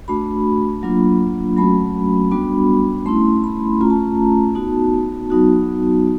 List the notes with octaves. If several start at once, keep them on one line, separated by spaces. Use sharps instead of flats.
A3 D4 F#4 B5
F#3 A#3 D4 F4
F#3 A3 C#4 F#4 B5
G3 B3 D4 F#4 B5
A3 C#4 E4 C6
B5
A3 C#4 F4 A#5
A5
A#5
B3 D#4 F#4 A5
F#3 B3 D#4 F#4